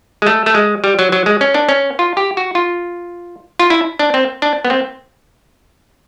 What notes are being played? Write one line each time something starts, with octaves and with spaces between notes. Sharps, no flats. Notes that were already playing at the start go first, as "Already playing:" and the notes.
G#3
A3
A3
G#3
G3
F#3
F#3
G#3
C#4
D4
C#4
F4
G4
F#4
F4
F4
E4
D4
C4
D4
B3
C4